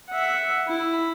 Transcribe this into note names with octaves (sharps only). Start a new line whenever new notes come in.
E5 F#5
E4 B5